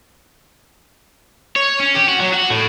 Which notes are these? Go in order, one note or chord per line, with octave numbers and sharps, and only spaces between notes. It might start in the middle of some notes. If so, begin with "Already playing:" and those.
C#5
C#4
G4
F#4
F#3
F#4
A2